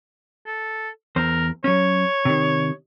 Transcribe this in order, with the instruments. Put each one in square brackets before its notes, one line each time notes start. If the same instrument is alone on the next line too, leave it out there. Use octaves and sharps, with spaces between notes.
[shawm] A4
[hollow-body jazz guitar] E2 C5 [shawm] A#4
[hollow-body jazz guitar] F#3 C#4 [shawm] C#5
[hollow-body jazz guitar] C3 D#3